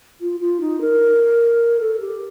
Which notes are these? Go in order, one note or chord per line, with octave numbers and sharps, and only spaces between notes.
F4
F4
D#4
A#4
A4
G4